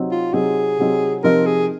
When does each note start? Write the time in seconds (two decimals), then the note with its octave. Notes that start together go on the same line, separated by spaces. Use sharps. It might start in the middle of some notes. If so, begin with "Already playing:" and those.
Already playing: C3 F#3 C4 D#4
0.11 F4
0.33 C3 F#3 C4 D#4 G#4
0.78 C3 F#3 C4 D#4
1.24 C3 F3 C4 D#4 A#4
1.46 G#4